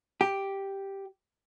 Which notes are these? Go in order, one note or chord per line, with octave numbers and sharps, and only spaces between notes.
G4